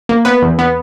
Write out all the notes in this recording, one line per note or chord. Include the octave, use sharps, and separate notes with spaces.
A#3
B3 B4
E2
B3